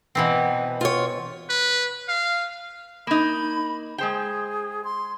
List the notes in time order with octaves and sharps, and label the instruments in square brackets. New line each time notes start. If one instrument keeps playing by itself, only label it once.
[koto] B2 E3 C4
[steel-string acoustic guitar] F4 C#5
[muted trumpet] B4
F5
[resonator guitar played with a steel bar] A#3 D#4 [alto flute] B5
[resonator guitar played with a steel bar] G#3 C5 G5 [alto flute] G#4
[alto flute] C6